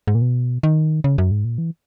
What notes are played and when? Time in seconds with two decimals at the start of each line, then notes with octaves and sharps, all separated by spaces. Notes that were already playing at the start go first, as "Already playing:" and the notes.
0.07 G#2
0.15 A#2
0.22 B2
0.63 D#3
1.04 C#3
1.18 F#2
1.31 G#2
1.45 A#2
1.58 E3